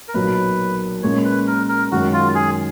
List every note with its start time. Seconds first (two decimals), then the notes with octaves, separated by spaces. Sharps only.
0.08 A#4
0.14 B1 A#2 F#3 A#3 B4
1.03 A#2 G#3 C#4 C#5
1.25 B4
1.47 A#4
1.69 A#4
1.91 F#2 D#3 G#3 D#4 F#4
2.13 F4
2.35 G#4